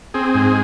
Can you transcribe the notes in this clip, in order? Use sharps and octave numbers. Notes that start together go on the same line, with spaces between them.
C4 G#4
G#2